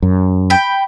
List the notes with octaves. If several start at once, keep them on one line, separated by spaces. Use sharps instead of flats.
F#2
G5 B5